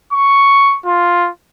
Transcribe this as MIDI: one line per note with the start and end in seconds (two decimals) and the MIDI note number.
0.13 0.77 85
0.85 1.29 65